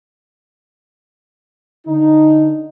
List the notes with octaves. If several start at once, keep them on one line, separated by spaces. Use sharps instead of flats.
D3 D#4